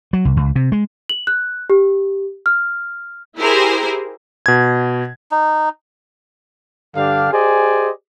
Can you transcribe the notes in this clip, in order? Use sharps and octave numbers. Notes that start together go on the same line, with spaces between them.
F#3
C2
C#2
C3
G#3
F#7
F#6
G4
F6
E4 G4 G#4 A#4 C5
B2 G#6
D#4
G2 D3 D4 G4 F5
G4 G#4 C5 D5 D#5 G#5